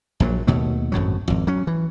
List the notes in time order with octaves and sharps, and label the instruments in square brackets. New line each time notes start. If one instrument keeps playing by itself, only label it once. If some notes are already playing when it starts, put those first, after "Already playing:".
[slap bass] A#1 A#2 E3 F#3
D#2 B2 A3
G#1 F#2 A2 F#3
G#1 F2
F#3 C#4
E3